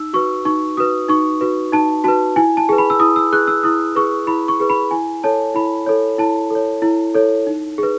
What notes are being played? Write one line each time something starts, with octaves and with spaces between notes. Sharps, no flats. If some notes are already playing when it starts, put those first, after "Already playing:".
Already playing: D#4 E6
F#4 B4 C#6
D#4 C#6
F#4 B4 D#6
D#4 C#6
F#4 B4
D#4 A5
F#4 B4 A5
E4 G#5
A5
G#4 B4
B5
E6
E4 D#6
E6
G#4 B4 F#6
E6
E4 D#6
G#4 B4 C#6
E4 B5
C#6
G#4 B4
B5
E4 G#5
A4 C#5 A5
E4 B5
A4 C#5
E4 A5
A4 C#5
E4
A4 C#5
D#4
G#4 B4